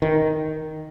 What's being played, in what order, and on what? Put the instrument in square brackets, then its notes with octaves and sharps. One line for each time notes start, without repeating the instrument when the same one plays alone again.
[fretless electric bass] D#3